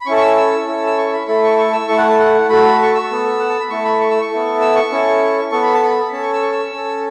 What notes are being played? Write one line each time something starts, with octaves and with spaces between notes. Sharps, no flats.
B5
C#4 E4 A4 C#6
C#6
E6
E6
C#4 E4 A4
E6
C#6
B5
A3 E4 A4 B5
C#6
C#6
E6
A3 E4 A4 C#6
F#5
A5
F#5
A3 F#4 A4 B5
C#6
E6
B3 A4
F#5
A5
B5
A3 E4 A4 C#6
B5
C#6
E6
C#6
B3 E4 A4
E6
C#6
C#4 E4 A4
B3 A4 C#6
B5
A5
B5
C#4 A5
A4 C#6
E6
C#6
E6
C#4 A4